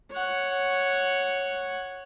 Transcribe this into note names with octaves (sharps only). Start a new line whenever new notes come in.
C#5 F#5